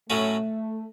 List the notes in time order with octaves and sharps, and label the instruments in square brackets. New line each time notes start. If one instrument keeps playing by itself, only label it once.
[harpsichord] A2 F#3 C#4 F#4 [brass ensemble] A3